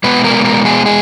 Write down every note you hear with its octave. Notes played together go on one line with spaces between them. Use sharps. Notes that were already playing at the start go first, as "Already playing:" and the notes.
B2 G#3 B3 B4
A#4
A#4
G#4
G#4